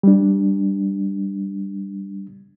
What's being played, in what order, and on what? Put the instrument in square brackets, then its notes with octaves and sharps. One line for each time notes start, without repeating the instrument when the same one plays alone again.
[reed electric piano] G3 D4